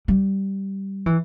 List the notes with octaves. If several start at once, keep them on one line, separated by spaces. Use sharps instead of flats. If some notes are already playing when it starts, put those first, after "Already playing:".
G3
E3